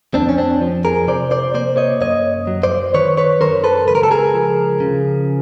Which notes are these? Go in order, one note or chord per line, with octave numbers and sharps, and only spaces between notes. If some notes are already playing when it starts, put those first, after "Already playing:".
F2 C4 D4
C#4
C4 D4
F3
G#4 A#4
C3 C5 D5
C5 D5
A#3 C5 D5
C#5 D#5
F#2 C#5 D#5
F#3
C5 D5
D#3 B4 C#5
B4 C#5
F#2 A#4 C5
A4 B4
C#2 B4
A#4
A4
G#4 A#4
F3
C#3